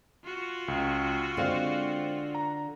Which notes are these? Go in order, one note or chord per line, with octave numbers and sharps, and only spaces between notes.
F4 F#4
C#2
D3 G#3 C4 F5
A#5